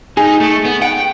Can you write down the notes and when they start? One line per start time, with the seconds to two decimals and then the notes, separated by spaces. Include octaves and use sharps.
0.17 D#4 G#4
0.41 A3
0.65 B3
0.82 F#5 G5